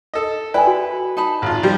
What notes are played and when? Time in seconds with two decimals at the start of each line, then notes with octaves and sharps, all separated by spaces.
0.14 A4 D#5
0.54 E4 B4 D5 G5 G#5
0.67 F#4
1.17 D#4 A5 B5
1.42 G#1 F4
1.63 F3 G3